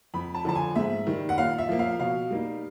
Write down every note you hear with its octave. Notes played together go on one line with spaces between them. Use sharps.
F2 B5
A5
D3 F3 A5
G#5
G#2 E5
D#3 G3
F#5
A#2 F5
E5
F3 A#3
F5
B2 F5
G3 A#3 D#4